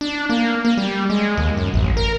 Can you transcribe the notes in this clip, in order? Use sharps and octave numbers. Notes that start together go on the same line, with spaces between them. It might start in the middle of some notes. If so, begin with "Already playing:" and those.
D4
A#3
A#3
G3
G#3
D#2
F#2
A1
A#4